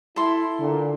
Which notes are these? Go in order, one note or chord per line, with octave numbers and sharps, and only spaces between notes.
E4 A4 C6
A#2 D3